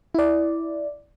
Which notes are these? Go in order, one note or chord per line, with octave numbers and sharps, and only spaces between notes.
E4 D5